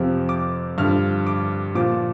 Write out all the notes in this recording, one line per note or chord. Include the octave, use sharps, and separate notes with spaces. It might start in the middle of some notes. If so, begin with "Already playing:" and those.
Already playing: F2 C3 F3
D6
G2 D3 F3 F6
D6
A#2 F3 D6